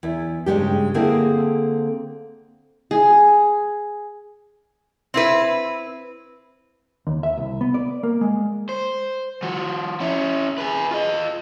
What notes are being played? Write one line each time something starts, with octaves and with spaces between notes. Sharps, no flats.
E2 E4
G2 C#3 G#3 G4
D3 A#3 C4 E4 G#4 A4
G#4
C4 E4 B4
D#2
E5
C2
B3
D5
A#3
G#3
C5
F3 F#4
C#4 E4
G#4 B4
F4 D#5